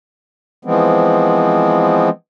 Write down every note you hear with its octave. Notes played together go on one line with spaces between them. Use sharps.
E3 F3 G#3 B3 C4